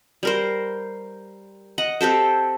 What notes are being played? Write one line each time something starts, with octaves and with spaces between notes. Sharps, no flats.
G3 A#4 C5
D#5 F#5
C4 G4 A4 C5